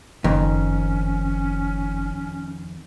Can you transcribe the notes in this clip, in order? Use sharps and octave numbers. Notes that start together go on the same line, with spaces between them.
F#1 F2 D#3 C#4